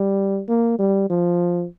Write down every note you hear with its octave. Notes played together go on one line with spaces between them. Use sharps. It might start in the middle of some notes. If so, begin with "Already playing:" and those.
Already playing: G3
A#3
G3
F3